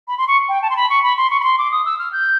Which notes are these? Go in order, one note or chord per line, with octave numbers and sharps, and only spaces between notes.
B5
C6
C#6
G5
A5
C6
B5
C#6
B5
C6
C#6
B5
C6
D6
D#6
E6
F6
G6